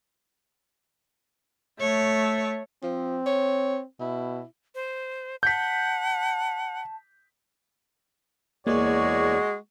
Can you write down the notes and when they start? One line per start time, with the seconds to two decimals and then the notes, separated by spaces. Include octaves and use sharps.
1.80 A3 C#5
2.83 F3 C4
3.26 C#5
4.00 B2 E4
4.75 C5
5.43 F#5 A5 G6 B6
8.67 E2 G#3 A#3 F#4 G#4 C#5 D5